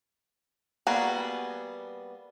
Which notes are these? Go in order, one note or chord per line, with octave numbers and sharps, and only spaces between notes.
G3 A#3 B3 F#4 G#4